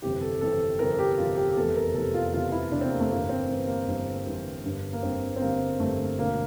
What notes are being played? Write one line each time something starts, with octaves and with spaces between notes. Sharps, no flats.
G1 F2 C3 E3 G4
A4
G1 F2 C3 E3 A4
G1 F2 C3 E3 A#4
G4
G1 F2 C3 E3 F4
G4
G4
F1 E2 C3 E3 A4
A#4
F1 E2 C3 E3 A4
F4
F1 E2 C3 E3 F4
E4
F1 E2 C3 E3 D4
C4
A#3
A3
G1 G2 E3 A#3
C4
G1 G2 E3
A#3
G1 G2 E3 A#3
G1 G2 E3
G1 G2 D3
A#3
G1 G2 D3 C4
C4
G1 G2 D3 A#3
G1 G2 D3 A3
E1 D2 D3 A#3